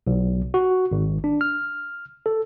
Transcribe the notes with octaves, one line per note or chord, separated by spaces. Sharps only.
B1
F#4
G#1
D4
F6
A4